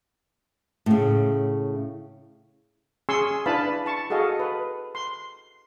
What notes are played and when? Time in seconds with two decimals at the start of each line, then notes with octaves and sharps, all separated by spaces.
0.86 A2 C#3
3.09 C#4 G#4 G#5 C6 C#6 E6
3.46 D4 E4 B4 F5 A5 B5
3.86 A5 C#6
4.10 F#4 G#4 A4 D#5 F5
4.39 B4
4.95 C6